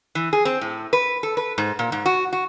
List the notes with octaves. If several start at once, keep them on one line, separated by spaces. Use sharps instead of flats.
E3
G#4
C4
A2
B4
A4
B4
G#2
A#2
G#2
F#4
F#4